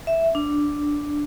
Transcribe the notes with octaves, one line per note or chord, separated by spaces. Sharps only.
E5
D4